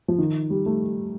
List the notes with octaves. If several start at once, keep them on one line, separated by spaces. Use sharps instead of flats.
F3
D#3
G3
A3